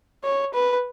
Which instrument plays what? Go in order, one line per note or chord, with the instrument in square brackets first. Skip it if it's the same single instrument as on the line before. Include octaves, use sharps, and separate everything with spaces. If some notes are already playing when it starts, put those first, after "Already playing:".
[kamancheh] C#5
B4